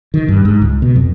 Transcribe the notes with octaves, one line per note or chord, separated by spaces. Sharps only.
D#3
G2
G#2
C#2
B2
F2